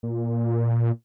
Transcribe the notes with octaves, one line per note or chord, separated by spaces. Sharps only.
A#2